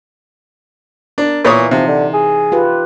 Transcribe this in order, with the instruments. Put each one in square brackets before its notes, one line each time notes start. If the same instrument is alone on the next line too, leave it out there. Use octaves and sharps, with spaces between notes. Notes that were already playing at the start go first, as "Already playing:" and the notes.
[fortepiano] D4 [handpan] A#4
[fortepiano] A#2 C#5 D#6 [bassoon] E3
[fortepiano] C3 [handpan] E3 D#4 [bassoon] F3
[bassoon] D3
G#4
[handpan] F4 G4 B4